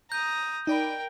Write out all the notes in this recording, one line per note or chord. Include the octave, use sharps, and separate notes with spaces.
A#5 D#6 G6
D#4 A#4 D5 G5 B5